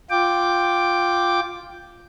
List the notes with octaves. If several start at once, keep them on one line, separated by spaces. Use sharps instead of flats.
F4 G5 D6